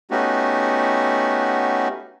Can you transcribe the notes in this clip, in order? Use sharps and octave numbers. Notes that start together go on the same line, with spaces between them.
A3 B3 C#4 D#4 F#4 G4